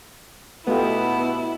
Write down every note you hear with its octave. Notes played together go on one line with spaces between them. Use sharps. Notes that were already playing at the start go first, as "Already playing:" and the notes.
B2 A3 B3 E4 F4 G4